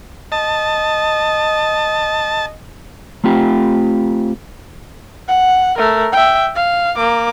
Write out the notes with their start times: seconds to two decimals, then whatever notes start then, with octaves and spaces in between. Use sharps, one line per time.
0.32 D#5 A5
3.24 A3 C4 F4 G4
5.28 F#5
5.78 A3 A#4
6.12 E5 G5
6.55 F5
6.96 A#3 D6